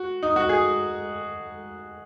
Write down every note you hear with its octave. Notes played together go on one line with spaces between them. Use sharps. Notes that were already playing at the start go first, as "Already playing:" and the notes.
Already playing: F#4
D#4
F#4
G#4